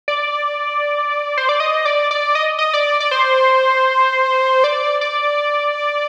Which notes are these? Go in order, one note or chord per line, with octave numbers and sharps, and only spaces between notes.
D5
C5
D5
D#5
D5
D5
D#5
D#5
D5
D5
C5
D5
D5